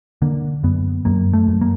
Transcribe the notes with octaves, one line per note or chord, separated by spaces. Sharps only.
D3 A#3
F#2 B3
F#2 A#3
A3
F#2
A#3